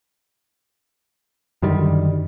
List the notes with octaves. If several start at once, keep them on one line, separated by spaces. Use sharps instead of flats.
F#2 D3 D#3 G3